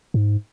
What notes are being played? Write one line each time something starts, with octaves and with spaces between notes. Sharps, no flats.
G#2